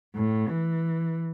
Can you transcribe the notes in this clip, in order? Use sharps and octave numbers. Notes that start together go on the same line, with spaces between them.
A2
E3